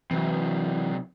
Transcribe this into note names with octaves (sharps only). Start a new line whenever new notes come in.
C3 E3 F#3